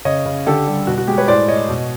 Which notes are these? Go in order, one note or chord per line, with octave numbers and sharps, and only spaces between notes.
C#3 C#5 D#5
C#3
D3 G4 A4
G3
B2 F#4
F#4
G#3 G4
B4 C#5
A2 C5 D5
A2 C#5 D#5
B2